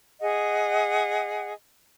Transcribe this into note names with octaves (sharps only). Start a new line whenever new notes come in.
G#4 D#5 F#5